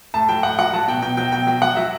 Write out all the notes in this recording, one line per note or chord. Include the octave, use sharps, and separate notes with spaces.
A2 A5
F#3 G5
A2 F#5
F#3 F#5
F#3 A5
B2 G5
B2 G5
F#3 G5
B2 G5
F#3 G5
F#3 F#5
F#3 E5